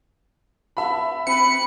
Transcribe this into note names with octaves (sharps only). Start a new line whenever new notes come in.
E5 B5
C4 B5 C#7